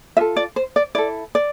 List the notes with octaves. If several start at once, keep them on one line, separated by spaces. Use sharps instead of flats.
F4 A4 E5
D5
C5
D5
E4 A4 D5
D5